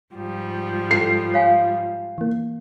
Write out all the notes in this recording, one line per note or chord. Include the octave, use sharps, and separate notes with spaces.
G#2 F3 G3
A4 C7
C#5 F5 G#5
E3 A#3